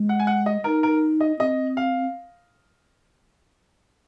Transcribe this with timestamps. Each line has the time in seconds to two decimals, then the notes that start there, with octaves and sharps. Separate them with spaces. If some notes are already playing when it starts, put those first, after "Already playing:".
Already playing: G#3
0.09 F#5
0.20 G#5
0.27 F#5
0.46 D#5
0.64 D#4 A#4
0.83 A#4
1.21 D#5
1.39 C4 D#5
1.77 F5